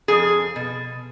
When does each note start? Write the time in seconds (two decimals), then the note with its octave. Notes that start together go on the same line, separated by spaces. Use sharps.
0.08 F2 F3 G#4
0.56 B2